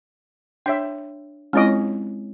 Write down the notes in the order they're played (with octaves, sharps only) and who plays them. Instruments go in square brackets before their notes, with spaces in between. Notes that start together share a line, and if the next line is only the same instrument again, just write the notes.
[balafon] D4 C#5 [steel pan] E5 G5
[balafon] G#3 C4 E4 [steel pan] C#4 F4 D#5